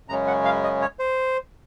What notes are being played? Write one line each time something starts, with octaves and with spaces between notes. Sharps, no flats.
F#2 C#3 G#3 C#4 A#5
F#5
F5
D#5
C#5
C5